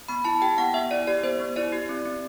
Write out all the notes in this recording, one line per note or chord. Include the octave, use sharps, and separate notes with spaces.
B3 B5
E4 A5
G4 G5
B3 F#5
B3 E5
E4 D5
G4 D5
B3 C5
B3
E4 D5
G4
C4
C4